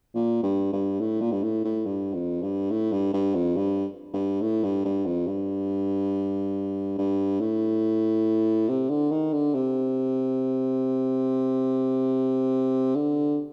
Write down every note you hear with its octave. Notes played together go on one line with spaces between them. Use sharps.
A#2
G2
G2
A2
A#2
G2
A2
A2
G2
F2
G2
A2
G2
G2
F2
G2
G2
A2
G2
G2
F2
G2
G2
A2
C3
D3
D#3
D3
C3
D3